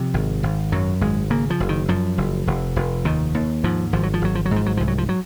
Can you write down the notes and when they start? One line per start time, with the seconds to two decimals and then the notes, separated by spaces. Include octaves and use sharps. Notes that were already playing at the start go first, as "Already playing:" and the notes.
Already playing: C3 F3
0.14 G#1
0.43 G#1
0.72 F#2 F#3
1.01 G#1 G#3
1.30 C#3 A#3
1.50 F3
1.60 F#1
1.69 D#3
1.88 F#2 F3
2.18 F#1
2.47 F1
2.76 F1
3.05 D#2 D#3
3.35 D#2
3.64 G#2 F3
3.93 G#1 F3
4.03 F#3
4.14 F3
4.22 G#1 F#3
4.35 F3
4.46 F#3
4.51 G#2 F3
4.66 F#3
4.77 C2 F3
4.88 F#3
4.98 F3
5.09 F#3